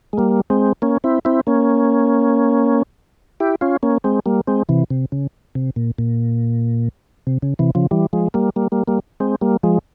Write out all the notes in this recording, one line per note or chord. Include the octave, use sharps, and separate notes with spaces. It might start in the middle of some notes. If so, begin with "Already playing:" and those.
G#3
G3 A#3
G#3 C4
A#3 C#4
C4 E4
C4 E4
A#3 C#4
E4 G4
C#4 F4
A#3 C#4
G#3 C4
G3 A#3
G#3 C4
C3 E3
C3
C#3
C3
A#2
A#2
C3
C#3
C3 E3
C#3 F3
E3 G3
F3 G#3
G3 A#3
G3 A#3
G3 A#3
G3 A#3
G#3 C4
G3 A#3
F3 G#3